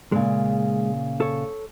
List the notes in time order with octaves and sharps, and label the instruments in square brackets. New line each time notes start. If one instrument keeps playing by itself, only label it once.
[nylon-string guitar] A#2 C#3 [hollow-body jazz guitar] G#3
[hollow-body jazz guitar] A4 C#5